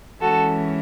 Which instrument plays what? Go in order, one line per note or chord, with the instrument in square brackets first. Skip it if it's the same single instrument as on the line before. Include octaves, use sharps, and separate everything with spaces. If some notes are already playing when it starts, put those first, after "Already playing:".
[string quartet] E3 G#3 C#4 F#4 A4